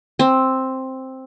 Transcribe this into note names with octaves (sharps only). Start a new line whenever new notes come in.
C4